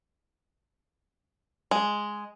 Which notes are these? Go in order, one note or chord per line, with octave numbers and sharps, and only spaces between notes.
G#3